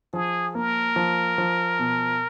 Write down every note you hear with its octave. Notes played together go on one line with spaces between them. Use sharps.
F3 G#4
A#3 A#4
F3
F3
B2